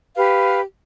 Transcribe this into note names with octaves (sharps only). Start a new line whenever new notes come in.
G4 B4 F5